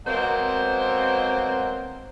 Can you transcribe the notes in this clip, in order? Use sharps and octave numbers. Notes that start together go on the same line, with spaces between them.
B2 F#3 G#3 A#3 C4 C5